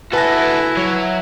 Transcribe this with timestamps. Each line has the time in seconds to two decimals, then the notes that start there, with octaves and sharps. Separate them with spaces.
0.13 E4 F#4 A4 B4 G#5 A#6
0.77 F#3 C#5